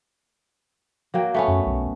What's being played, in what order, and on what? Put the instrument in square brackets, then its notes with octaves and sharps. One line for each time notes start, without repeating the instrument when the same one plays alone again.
[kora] F#3 A#3 G5
A3 B3 C#4
[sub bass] F#2
B1